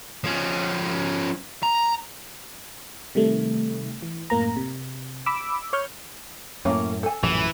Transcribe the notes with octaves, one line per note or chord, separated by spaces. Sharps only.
F3 C#4
A#5
C3 D#3 G3 A3
E3
F#2 A2 A#3 A#5
C3
B5 D6 E6
C#5 C#6 F6 G6
F#2 A2 A#3 C#4
A4 G#5
A#1 F#2 A2 E3